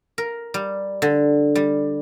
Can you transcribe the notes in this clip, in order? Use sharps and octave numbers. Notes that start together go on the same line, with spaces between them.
A#4
G3
D3
G3